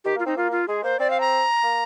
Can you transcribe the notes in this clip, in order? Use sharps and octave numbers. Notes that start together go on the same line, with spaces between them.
D#3 G4
A#3
F4
C4 D#4
A#3 F4
F4
G#3 G#4
A#3 C5
C4 D5
F5
A#5
A#3